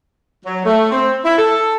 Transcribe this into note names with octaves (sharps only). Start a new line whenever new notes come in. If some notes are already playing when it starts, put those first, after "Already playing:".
F#3
A3
C4
E4
A4